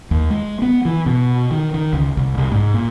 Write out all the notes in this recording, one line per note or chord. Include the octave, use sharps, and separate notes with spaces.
D#2
G#3
B3
E3
B2
D#3
D#3
C#2
C2
C2
G#2
A#2